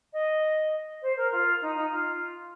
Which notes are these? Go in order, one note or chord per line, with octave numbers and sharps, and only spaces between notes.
D#5
C5
A#4
F4
D#4
D#4
F4